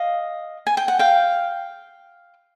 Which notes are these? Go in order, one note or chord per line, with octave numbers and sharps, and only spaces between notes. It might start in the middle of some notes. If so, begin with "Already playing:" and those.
Already playing: D#5 F5
G#5
G5
F#5
F5 G5